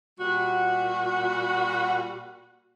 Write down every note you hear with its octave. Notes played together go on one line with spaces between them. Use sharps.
A#2 G3 F#4